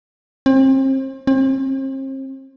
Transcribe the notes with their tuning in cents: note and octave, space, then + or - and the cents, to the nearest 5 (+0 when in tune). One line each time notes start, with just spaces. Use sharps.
C4 +35
C4 +40